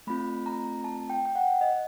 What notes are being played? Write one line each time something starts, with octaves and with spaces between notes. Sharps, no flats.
A3 C4 F4 B5
A#5
A5
G5
G5
F#5
D#5